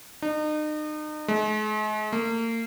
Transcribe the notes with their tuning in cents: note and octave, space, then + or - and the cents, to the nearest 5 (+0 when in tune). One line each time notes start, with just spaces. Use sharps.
D#4 -35
G#3 +45
A#3 -35